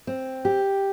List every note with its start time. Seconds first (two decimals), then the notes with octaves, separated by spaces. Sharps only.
0.07 C4
0.45 G4